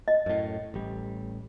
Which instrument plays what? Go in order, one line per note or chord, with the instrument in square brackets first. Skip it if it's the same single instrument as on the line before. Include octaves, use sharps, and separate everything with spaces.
[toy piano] D#5
[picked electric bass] F#2 A2
A1 G3